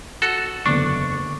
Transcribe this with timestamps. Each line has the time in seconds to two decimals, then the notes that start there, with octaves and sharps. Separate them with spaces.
0.22 F#4 A4
0.66 F#1 E2 D3 D4 C#6